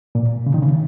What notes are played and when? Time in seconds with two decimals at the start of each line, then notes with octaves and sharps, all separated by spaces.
0.15 A#2
0.46 C#3
0.54 D#3
0.62 C#3